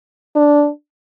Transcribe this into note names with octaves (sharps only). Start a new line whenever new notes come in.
D4